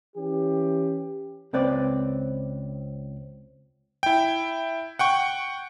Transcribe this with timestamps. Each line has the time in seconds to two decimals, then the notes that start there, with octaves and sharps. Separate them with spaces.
0.16 E3 C#4 G4
1.53 C#2 C4 B4 D5
4.03 E4 G5
4.99 F#5 G5 C#6